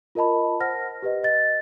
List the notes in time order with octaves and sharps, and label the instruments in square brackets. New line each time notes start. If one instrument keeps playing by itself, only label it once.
[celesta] F4 A#4 D#5 A5 B5
C5 F#5 F6 A#6
G4 B4 D#5
D#5 A6